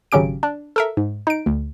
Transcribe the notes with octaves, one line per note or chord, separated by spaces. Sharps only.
G#1 C#3 F#3 C#4 G4 D7
D4
A4 A#4 E5
G#2
D#4 D7
D2